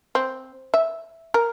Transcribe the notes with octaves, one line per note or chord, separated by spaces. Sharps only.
C4
E5
A#4